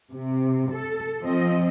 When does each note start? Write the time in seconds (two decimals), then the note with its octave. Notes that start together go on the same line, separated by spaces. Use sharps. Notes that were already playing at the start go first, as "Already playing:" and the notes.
0.11 C3
0.74 A4
1.21 F3 C4 D#5